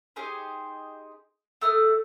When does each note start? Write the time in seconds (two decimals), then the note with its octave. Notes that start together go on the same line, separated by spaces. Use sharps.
0.16 D#4 G4 G#4 C5
1.61 A3 A4 D#6 F6